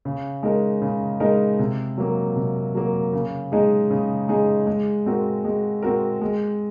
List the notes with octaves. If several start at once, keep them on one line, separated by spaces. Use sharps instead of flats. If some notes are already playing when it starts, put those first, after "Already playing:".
C#3
G#3 D#4 A#4
C#3
G#3 D#4 A#4
C3
F#3 A#3
C3
F#3 A#3
C#3
G#3 D#4 G#4
C#3
G#3 D#4 G#4
G#3
C4 F#4 A#4
G#3
C4 F#4 A#4
G#3